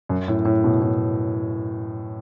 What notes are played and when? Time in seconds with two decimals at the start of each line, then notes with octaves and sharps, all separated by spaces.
0.09 F#2
0.28 A2
0.45 A2
0.64 B2
0.82 A2